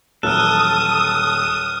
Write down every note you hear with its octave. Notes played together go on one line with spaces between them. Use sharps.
D#1 E3 F#3 A4 D#6 F6 F#6